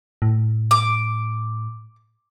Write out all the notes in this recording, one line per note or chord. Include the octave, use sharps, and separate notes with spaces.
A2
D6